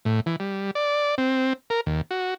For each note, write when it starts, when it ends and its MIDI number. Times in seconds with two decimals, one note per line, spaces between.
0.05 0.20 45
0.26 0.36 52
0.40 0.71 55
0.75 1.15 74
1.18 1.53 60
1.70 1.81 70
1.86 2.01 39
2.11 2.34 66